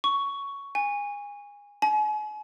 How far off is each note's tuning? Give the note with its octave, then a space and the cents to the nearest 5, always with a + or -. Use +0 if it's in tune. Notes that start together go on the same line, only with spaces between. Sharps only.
C#6 +10
G#5 -20
G#5 +40